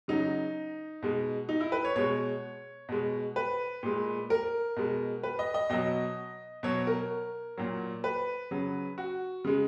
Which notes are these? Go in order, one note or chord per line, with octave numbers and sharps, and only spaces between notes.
C#3 F#3 D#4
B2 G#3
D#4
E4
B4
C#5
B2 G#3 C#5
B2 G#3
B4
A#2 G#3
A#4
B2 G#3
B4
D#5
D#5
B2 F#3 D#5
B2 F#3 C#5
A#4
A#2 F#3
B4
C#3 F#3
F#4
C#3 G#3